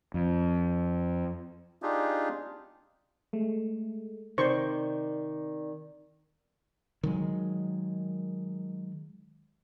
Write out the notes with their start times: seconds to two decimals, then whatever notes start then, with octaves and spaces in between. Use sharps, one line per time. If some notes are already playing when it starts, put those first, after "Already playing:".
0.14 F2
1.82 D4 D#4 F4 G4 G#4
3.33 G#3 A3
4.38 C3 D#3 C5 D5 C#6
7.03 D#3 F#3 G#3